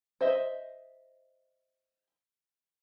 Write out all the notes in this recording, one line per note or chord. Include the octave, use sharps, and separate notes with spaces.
C5 D#5 E5